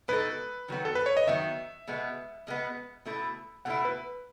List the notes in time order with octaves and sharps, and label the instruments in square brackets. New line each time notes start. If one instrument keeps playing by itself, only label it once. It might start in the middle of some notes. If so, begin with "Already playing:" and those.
[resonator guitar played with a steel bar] B2 G#3 D#4 A4 [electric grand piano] B4
[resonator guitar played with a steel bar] D#3 F#3 B3
[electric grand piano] A4
B4
C#5
D#5
[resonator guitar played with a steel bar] D#3 F#3 B3 [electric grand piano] E5
[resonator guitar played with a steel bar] B2 G#3 B3
B2 G#3 B3
B2 A3 E4
[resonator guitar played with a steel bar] B2 A3 E4 [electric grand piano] F#5
[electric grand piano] B4